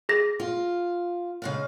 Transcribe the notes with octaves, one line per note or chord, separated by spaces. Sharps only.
G#4 A#6
F4
C#3 G#3 F5